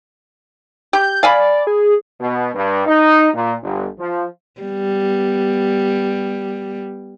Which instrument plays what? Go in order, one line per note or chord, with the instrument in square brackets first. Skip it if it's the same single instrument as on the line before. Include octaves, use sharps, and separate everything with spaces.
[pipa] G4 [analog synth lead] G6
[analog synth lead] D5 [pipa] F5 G#5 B5
[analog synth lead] G#4
[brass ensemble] B2
G2
D#4
A#2
G1
F3
[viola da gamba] G3 B3